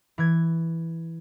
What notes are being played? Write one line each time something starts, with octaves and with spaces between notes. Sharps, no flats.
E3 G#6